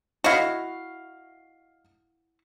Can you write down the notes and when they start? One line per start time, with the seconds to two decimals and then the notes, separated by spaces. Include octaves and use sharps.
0.24 E4 F#4 D#5 F5